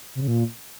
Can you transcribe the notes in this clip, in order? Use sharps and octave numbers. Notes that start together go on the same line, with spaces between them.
C3
C#3
A#2